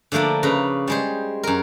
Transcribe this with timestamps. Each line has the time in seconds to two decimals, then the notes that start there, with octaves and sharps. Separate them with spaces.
0.12 D3 F3 A3 A#3 D4
0.43 C#3 B4 A#5
0.87 G3 G#3 C5
1.43 F#2 A#4